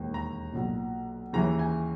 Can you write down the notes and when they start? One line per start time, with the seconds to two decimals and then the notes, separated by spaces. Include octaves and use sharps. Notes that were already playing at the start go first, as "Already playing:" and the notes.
Already playing: E1 D#2 D#3
0.14 A#5
0.53 B1 A#2
1.33 D#2 C#3 E3 A#5
1.59 G#5